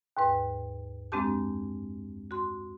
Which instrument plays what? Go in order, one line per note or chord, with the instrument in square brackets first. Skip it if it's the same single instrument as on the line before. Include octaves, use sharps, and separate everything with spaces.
[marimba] D#2 G#2 B4
F#2 G#3 C4 D4 G4 A5
F#4 C6